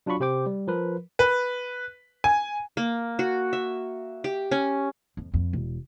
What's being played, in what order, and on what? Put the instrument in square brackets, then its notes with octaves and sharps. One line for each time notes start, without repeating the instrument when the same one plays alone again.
[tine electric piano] F#3 D4 F4 F#4 B5 C#6
C3 G4 C5 G5 D6
G3
F3 A#4 B4
[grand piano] B4
G#5
[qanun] A#3
F#4
E5
G4
C#4
[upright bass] F2
F2
E1